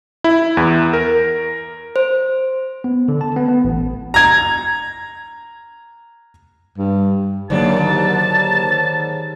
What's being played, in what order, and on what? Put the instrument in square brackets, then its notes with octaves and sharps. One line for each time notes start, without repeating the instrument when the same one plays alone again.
[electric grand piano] E4
E2
A#4
[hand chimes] C5
[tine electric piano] B3
D3
A5
B3
B3
A1
[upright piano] A#5 G#6
[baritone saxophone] G2
[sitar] D#2 G#2 D4 [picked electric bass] D3 F#3 A#3 [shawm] A5